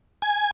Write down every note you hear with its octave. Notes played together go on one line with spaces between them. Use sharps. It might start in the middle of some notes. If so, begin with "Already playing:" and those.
G#5